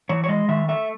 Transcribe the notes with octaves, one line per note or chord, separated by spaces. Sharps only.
E3 C#5
C#5
G#3 D#5
D#3 E5
A3 E5